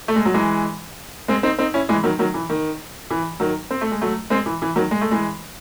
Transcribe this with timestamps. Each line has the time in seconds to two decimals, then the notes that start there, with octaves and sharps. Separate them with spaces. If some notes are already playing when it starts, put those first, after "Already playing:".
0.08 A3
0.16 G#3
0.25 F#3
0.34 E3 G#3
1.28 G#3 C4
1.43 C4 D#4
1.59 C4 D#4
1.74 C#4 E4
1.89 E3 G#3
2.04 D#3 F#3
2.19 D#3 F#3
2.34 E3
2.50 D#3
3.10 E3
3.40 D#3 F#3
3.71 C4
3.81 A3
3.91 G#3
4.02 F#3 A3
4.30 G#3 C4
4.46 E3
4.62 E3
4.76 D#3 F#3
4.91 G#3
5.01 A3
5.11 E3 G#3